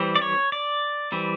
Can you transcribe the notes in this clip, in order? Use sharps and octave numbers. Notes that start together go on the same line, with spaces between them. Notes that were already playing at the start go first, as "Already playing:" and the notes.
Already playing: E3 G3 C4
D5
C#5
D5
E3 G3 C4